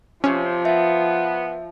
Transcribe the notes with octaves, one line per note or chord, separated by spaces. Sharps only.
C3 F3 C#4
B3 E5